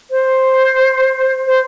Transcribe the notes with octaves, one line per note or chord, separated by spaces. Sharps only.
C5
C5